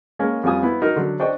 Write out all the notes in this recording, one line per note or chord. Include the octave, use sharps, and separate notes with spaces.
G#3 A#3 C#4 A#4
F2 G3 F4 G#5 D#6
B3 E4
D#4 F#4 A#4
D3 F#3
D4 C5 D#5 G5 C#6